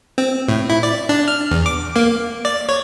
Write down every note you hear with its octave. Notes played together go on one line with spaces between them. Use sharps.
C4
A2
E4
D5
D4
F6
E2
D6
A#3
D5
C#5